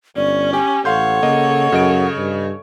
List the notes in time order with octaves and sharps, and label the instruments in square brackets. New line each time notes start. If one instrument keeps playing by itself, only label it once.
[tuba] G1 [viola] C#4 [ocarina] D5
[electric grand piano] G4 [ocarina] G#5
[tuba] A1 [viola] A4 C#5 [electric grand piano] F5 C6 G6 [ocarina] F#5
[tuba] C#3 [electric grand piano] A#3 D#5
[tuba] F#2 [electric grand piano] C#3 D#5 D7
[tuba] G2